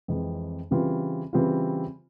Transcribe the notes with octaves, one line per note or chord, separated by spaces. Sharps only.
F2 E3 G#3 C4
C#3 E3 G3 C4 F4
C#3 E3 G3 C4 F4